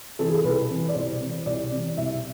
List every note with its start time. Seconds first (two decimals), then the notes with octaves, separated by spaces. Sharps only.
0.19 C3 E3 A4
0.26 G#4
0.33 A4
0.44 C2 B4
0.70 C3 E3
0.89 D5
0.95 C2 C5
1.21 C3 E3
1.46 C2 D5
1.72 C3 E3
1.97 C2 E5